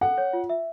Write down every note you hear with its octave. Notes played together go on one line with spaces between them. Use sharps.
A4 F#5
C#5
F4
E5